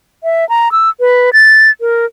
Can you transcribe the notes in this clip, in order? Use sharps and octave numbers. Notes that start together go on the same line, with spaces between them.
E5
A#5
E6
B4
A6
A#4